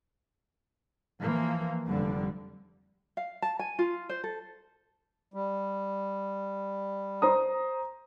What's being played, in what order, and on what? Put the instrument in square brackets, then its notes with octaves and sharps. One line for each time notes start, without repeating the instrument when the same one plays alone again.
[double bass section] E3 F3 A#3
F1 D3 G3
[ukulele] F5
A5
G#5
F4
C5
A4
[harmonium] G3
[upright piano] C5 A#5 D#6